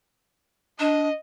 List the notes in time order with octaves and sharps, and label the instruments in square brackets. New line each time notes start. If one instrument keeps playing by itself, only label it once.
[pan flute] D4 [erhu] D#5